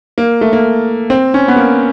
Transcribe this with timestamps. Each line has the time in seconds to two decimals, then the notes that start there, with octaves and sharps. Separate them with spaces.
0.18 A#3
0.41 A3
0.53 A#3
1.10 C4
1.34 C#4
1.48 B3
1.56 A#3